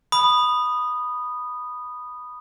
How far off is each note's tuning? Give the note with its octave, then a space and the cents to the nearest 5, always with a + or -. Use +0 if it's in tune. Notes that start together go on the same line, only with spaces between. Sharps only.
B5 +0 D#6 -10